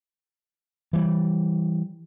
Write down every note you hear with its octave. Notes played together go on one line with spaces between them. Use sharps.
E3 G3